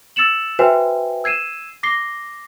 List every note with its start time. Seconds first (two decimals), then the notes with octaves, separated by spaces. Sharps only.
0.16 E6 A6 C#7 E7 F#7
0.59 F#4 B4 C5 E5 G5 G#5
1.24 E6 G#6 C7 D#7 E7
1.83 D6 A#6 C7 G7